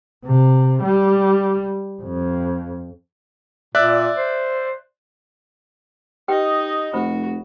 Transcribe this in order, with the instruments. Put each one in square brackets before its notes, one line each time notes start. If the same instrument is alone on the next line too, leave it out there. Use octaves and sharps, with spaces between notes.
[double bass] C3
G3
F2
[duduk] A#2 [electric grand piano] D5 E5 F#6
[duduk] C5
[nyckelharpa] D#4 D#5 [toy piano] G4 B4 G5
[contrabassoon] F1 [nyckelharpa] F#4 [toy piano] C5 B5